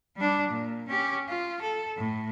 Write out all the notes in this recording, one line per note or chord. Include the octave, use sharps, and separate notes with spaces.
G3 D4
A#2
C#4 G4
F4
A4
A2